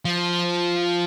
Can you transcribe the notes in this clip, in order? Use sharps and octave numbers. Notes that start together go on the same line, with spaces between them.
F3